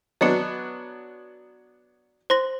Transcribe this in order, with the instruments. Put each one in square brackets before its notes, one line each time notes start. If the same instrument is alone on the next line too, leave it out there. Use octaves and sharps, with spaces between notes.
[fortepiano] F#3 B3 D4 [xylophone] D#5 C#7
[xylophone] C5 C6 A#6